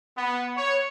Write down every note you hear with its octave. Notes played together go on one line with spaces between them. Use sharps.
B3
C#5